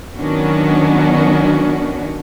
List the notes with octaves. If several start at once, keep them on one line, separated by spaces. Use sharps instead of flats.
D#3 F#3 B3 C#4 D4 F#4